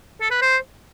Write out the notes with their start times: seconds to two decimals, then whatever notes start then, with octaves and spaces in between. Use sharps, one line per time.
0.21 A4
0.31 B4
0.42 C5